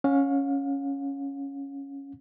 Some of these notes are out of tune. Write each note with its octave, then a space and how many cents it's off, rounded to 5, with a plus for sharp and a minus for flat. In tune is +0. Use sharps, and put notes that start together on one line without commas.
C#4 +0 F5 +40